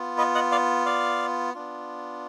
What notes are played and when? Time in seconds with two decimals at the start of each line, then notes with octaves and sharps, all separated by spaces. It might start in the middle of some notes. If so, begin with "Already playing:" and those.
Already playing: B3 F4
0.18 B4 D#5
0.35 D#5 F#5
0.52 D5 F5
0.86 D5 F5
1.54 B3 D4 F4